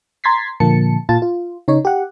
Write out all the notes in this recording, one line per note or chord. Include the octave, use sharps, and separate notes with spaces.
A#5 C6 G#6 A6 B6 C7
A#2 D3 F3 A#3 A5 C#7
A#2 F4 A5 A6
F4
C#3 D#4 C#5
G4 F#5